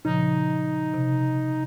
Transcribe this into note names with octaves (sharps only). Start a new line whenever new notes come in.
A#2 C#3 F3 D#4
C3